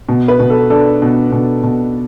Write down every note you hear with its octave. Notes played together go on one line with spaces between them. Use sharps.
B2
B4
B2
A4
D4 A4
B2
B2
B2